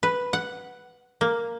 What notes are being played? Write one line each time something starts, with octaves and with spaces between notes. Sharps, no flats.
B4
F#5
A#3